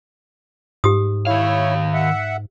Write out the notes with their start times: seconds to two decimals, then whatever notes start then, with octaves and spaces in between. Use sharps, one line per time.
0.84 G#2 G4 D#6
1.27 D#3 E4 C#5 F5
1.93 E5 F#5